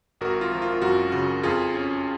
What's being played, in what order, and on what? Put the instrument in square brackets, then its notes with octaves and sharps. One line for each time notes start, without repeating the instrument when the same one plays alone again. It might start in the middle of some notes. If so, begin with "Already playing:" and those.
[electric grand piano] G#1 F#4 A#4
F4
F3
F4
F4
F#2 F#4
C#3 F#4
F2 F4 G#4
C#4